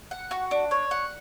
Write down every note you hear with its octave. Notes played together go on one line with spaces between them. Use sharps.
F#5
F#4
D4
C#5
F#5